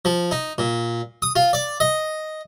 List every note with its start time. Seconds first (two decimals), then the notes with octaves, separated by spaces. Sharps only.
0.05 F3
0.31 D#4
0.58 A#2
1.22 D#6
1.36 F4
1.53 D5
1.80 D#5